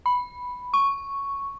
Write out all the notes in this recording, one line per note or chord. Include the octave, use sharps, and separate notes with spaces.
B5
C#6